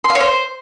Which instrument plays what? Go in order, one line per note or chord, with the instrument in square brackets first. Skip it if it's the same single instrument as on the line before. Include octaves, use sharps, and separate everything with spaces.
[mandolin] C6
F5
C#5
C5